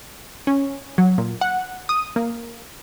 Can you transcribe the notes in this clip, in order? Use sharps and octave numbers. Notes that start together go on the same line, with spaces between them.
C#4
F#3
A#2
F#5
D#6
A#3